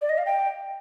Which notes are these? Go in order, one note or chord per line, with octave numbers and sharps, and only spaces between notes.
D5
D#5
F5
G5